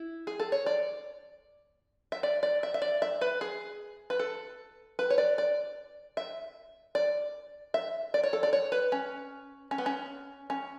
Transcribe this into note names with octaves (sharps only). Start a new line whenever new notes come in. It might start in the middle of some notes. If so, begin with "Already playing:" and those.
Already playing: E4
G#4
A4
C#5
D5
E5
D5
D5
E5
E5
D5
E5
B4
G#4
B4
A4
B4
C#5
D5
D5
E5
D5
E5
D5
C#5
A4
D5
C#5
B4
C#4
C#4
B3
C#4
C#4